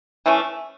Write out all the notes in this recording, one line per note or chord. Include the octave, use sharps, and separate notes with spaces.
E3 A3 C#4